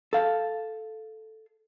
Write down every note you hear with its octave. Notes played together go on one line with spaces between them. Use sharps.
A4 F5